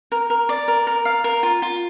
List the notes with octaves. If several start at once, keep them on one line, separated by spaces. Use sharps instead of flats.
A#4
A#4
D5
A#4
A#4
F5
A#4
F4
F4